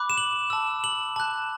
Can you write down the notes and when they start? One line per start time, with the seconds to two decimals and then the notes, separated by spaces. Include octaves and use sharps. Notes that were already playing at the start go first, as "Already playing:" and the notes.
Already playing: B5 D6 F#6
0.10 E7
0.18 F#7
0.50 A5 E6
0.84 F#7
1.16 A5 F#6